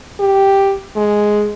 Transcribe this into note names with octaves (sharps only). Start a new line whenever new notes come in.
G4
G#3